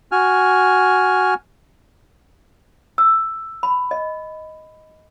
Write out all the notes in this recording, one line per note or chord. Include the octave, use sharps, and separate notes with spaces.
F#4 G#5 F6
E6
B5
D#5